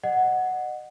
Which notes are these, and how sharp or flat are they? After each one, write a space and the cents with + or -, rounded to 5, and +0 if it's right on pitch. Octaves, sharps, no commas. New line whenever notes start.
D#5 -35 F#5 +0